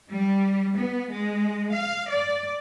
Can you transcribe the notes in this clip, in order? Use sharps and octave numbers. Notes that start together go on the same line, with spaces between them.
G3
B3
G#3
F5
D5